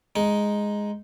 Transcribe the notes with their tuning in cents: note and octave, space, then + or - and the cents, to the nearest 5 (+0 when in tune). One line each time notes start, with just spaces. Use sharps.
G#3 +0 D#4 +0